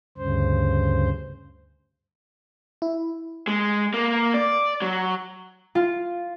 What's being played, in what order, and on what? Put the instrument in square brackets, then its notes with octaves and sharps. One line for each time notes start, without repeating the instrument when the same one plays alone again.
[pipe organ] D2 G2 C#3 C5
[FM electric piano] E4
[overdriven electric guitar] G#3
A#3
D5
F#3
[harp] F4